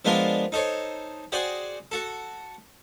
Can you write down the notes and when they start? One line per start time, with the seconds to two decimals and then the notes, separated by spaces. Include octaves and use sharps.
0.05 F3 G#3 B3 D4 F4 A#4
0.52 D#4 A4 C5 C#5
1.32 F#4 G#4 C5 D5 G5
1.92 F#4 A4